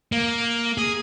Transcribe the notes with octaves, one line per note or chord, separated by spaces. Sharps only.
A#3
G#4